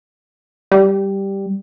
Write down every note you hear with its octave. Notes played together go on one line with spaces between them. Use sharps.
G3